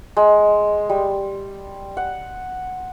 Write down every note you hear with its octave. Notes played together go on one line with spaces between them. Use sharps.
G#3
G3
F#5